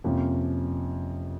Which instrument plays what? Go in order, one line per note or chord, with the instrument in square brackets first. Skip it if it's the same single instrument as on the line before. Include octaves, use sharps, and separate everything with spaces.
[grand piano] F2 C3 F3 A#3 C#4